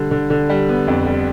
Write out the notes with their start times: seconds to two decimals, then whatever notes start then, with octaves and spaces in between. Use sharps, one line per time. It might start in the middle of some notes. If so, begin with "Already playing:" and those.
Already playing: D3 G3
0.11 D3
0.30 D3
0.49 G3
0.69 B3
0.88 F2
1.06 G3